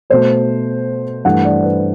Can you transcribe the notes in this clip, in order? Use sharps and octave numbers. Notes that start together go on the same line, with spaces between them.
B2 A3 C5
G2 E3 A3 F#5
D5
B4